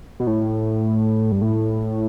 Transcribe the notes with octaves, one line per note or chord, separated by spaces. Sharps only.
B2
A2
G2
A2